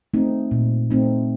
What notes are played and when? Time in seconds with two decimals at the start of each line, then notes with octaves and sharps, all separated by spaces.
0.14 A3 C4 D#4
0.51 A#2
0.91 A3 C4 D#4